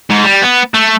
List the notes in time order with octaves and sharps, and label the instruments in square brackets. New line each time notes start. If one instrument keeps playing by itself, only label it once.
[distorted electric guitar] G#2
G3
B3
A3